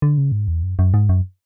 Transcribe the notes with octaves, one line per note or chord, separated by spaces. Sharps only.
D3
C#3
G#2
E2
F#2
F#2
G#2
F#2